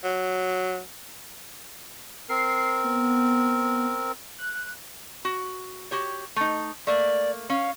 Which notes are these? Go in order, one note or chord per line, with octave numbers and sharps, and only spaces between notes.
F#3
C4 A#4 C7
B3
F#6
F#4
F#4 G4 C#5
A3 D#4
A3 A#3 D5
C#4 F5